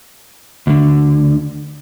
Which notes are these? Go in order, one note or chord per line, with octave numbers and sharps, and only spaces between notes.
D2 D3